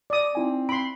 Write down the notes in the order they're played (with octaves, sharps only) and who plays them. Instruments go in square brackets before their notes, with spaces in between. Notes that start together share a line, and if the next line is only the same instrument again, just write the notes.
[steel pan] D5 D#6
[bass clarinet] C4 [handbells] D#4 E4 G#5
[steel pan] B5 C6 [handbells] D7